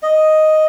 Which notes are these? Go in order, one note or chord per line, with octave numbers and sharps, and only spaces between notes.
D#5